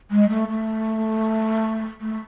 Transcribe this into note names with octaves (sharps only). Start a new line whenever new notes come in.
G#3
A3
A3
A3